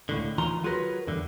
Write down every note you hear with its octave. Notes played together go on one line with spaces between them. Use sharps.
C#2 A2 D3
D#2 D#3 E3 F4 A#5 C6
F#3 F4 F#4 G#4 A#4 B4
E2 G2 D3